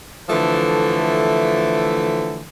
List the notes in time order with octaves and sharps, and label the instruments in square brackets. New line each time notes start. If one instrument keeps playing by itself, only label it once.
[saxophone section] D3 E3 F3 A3